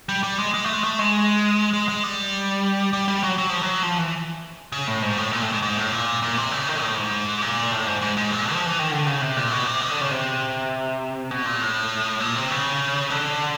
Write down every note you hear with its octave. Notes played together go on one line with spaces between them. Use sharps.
G3
G3
G#3
G#3
A3
G#3
A3
G#3
G#3
G#3
G3
G3
G3
F#3
F#3
F3
F#3
F3
E3
C#3
A2
G#2
A2
A#2
A2
G#2
G#2
A2
A#2
A#2
C3
C#3
D#3
A2
G#2
A#2
A2
G#2
G#2
G#2
A#2
F3
E3
D#3
D3
C#3
C3
A#2
B2
C3
D#3
D3
C#3
C3
B2
A#2
A2
A#2
C3
C#3
D3